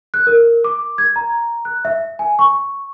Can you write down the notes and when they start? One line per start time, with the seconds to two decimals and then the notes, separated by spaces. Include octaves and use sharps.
0.14 F#6
0.27 A#4
0.64 D6
0.98 G#6
1.16 A#5
1.65 F#6
1.85 E5
2.19 G#5
2.39 C#6